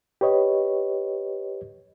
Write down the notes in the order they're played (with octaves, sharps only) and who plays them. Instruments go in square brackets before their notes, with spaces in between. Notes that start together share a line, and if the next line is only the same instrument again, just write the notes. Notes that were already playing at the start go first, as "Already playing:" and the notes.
[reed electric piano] G4 B4 C#5 D#5